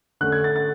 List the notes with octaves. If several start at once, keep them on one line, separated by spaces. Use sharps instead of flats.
D3 A3 C#4 F#6
G#6
A6
A6